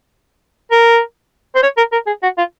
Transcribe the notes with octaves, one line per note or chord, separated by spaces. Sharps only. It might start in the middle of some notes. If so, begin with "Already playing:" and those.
A#4
C5
C#5
A#4
A#4
G#4
F#4
F4